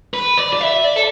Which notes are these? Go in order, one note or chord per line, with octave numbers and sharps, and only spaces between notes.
B4
D5
D5
E5
D5
A4